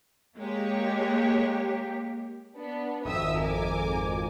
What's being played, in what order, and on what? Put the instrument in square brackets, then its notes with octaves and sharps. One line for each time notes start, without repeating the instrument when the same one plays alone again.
[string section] G#3 C#5 [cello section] A#3 G4
[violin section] B3 D4
[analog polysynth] G#1 F2 [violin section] E5 D#6 E6
[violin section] A#4 G#5 D6